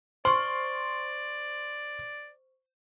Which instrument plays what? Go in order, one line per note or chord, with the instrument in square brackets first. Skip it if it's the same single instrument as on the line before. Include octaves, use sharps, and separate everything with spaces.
[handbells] C5 C#6 [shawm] D5 [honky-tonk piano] C6